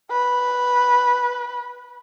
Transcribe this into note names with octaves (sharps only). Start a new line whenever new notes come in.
B4